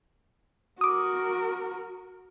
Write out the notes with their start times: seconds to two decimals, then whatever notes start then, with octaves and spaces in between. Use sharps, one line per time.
0.81 F#4 A#4 D6 D#6